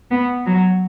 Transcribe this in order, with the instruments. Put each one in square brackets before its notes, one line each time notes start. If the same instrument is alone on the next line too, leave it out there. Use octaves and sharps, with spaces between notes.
[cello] B3
F#3